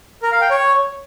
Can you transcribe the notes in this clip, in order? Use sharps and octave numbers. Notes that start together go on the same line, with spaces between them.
A#4
F5
G5
C#5